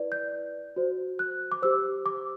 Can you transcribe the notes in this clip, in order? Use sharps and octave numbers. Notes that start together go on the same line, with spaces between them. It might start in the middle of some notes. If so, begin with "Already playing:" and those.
Already playing: E4 B4 D5
G6
F#4 C5
F#6
D6
G4 C5 E6
D6